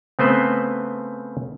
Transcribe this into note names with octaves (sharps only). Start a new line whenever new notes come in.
C#3 A3 B3 C4 B4 C5